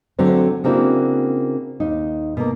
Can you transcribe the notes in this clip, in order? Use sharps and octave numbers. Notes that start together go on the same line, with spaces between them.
D3 F#3 A3 C4
C#3 A#3 C4 D4 E4 F#4
D#2 D#4
B2 A#3